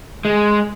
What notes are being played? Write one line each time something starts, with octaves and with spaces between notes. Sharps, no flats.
G#3